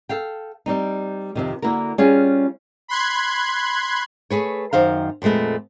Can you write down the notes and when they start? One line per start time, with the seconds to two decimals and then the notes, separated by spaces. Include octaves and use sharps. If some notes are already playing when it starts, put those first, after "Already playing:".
0.09 A4 F5 G5
0.66 G3 C4 D#4
1.35 F2 C3 D#3
1.62 D3 A#3 E4 F#4 A#4
1.98 G3 C#4 F4 G#4 C5 F5
2.88 B5 C6 F#6 G#6
4.30 A3 G#4 B4 C#5
4.73 F#2 D#3 C5 F5
5.22 F2 A#2 G#3 A3 B3